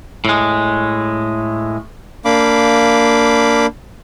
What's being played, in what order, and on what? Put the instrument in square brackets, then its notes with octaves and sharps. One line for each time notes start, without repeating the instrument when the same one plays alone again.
[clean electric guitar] A2 G#3
[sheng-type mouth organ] A#3 D4 F5 B5 D6